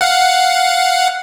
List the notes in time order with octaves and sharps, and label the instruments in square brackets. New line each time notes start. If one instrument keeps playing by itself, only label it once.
[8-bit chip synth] F5 F#5